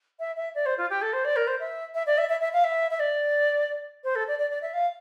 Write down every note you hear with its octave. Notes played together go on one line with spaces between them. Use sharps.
E5
E5
D5
C5
F4
G4
A4
C5
D5
A#4
C5
E5
E5
D5
E5
E5
E5
F5
E5
E5
D5
C5
A4
D5
D5
D5
E5
F5